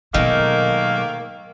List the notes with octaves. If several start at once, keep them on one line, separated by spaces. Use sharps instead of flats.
G#2 B2 D#3 F#3 A3 A#3